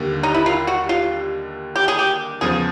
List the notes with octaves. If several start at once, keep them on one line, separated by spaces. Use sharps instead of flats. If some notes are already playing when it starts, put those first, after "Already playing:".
Already playing: D#2 D3 G3 A#3
D#4
E4
F4
F#4
F4
G4
G#4
G4
E2 C#3 F3 G#4